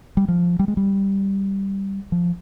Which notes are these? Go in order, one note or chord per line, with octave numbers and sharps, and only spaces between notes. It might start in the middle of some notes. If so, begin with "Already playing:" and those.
G3
F3
G3
G#3
G3
F3